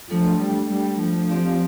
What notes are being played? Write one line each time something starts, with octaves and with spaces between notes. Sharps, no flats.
F3 A3 D4 A4
G3
G3
F3
C4 G4 D5 F5